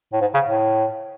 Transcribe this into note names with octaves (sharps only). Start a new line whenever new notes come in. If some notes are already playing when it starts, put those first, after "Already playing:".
A2
G#2
C#3
A2